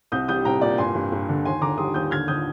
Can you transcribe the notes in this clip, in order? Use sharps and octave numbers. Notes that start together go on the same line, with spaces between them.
C2 D#6 G6
G3 D#6 G6
C2 G5 A#5
A#2 D5
G2 G#5 C6
G2
G2
D3
D#2 G#5 C6
D3 A#5 D6
G3 C6 D#6
D#2 D#6 G6
D3 F6 G#6
D3 D#6 G6